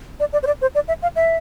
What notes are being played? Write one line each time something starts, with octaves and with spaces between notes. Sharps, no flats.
D5
D5
C5
D5
C5
D5
E5
F5
E5